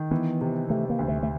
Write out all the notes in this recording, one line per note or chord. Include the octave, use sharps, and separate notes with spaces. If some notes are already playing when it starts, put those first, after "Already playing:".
Already playing: D#3
E3 B3
C3
C3 A3
A#3
D2
A3
A3